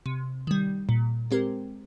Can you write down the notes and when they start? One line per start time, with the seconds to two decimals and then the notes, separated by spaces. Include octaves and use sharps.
0.06 C3
0.47 D#3 G3
0.89 A#2
1.31 G#3 C4 G4 A#4